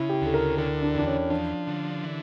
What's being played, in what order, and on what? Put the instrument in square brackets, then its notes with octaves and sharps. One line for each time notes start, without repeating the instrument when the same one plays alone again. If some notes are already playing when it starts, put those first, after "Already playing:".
Already playing: [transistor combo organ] C#3 [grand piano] E4
[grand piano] G4
[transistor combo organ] D2 [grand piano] A4
[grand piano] A#4
[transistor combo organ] D3 [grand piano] A#4
[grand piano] D4
[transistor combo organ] E2 [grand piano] D4
[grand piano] C#4
[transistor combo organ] F3 [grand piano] D4
[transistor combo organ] D3
E3